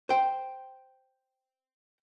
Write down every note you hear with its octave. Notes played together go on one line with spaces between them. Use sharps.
C5 G5